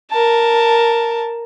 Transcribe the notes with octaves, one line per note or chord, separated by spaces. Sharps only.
A#4 A5